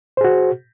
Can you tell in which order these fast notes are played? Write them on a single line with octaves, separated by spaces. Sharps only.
C5 G#4 F#4